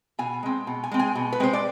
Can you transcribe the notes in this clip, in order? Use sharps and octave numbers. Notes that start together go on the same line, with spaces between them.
B2 G#5
G#3 C4
B2
G#5
G#3 C4
G#5
B2
B4
G#3 C4 C5
D5